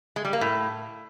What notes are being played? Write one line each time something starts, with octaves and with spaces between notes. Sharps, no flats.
G#3
G3
A#3
A2